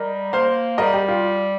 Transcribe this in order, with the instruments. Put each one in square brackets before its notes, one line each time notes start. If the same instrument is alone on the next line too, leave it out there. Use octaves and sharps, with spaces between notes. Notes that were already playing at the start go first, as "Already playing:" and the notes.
Already playing: [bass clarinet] G3 [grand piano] A#4 D#5
[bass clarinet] A#3 [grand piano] C5 F5
[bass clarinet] G3 [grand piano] A#4 D#5
[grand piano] G4
F4